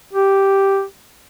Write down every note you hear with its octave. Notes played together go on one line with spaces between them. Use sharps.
G4